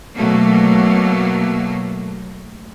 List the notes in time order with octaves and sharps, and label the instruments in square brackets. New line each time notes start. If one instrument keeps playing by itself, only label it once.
[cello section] B2 F#3 A3 A#3